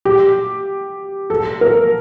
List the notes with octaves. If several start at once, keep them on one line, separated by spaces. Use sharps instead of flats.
G4
A4
A#4